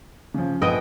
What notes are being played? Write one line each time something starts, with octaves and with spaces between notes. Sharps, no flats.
C#3 F3
A#1 F3 B3 D#5 G5 D#6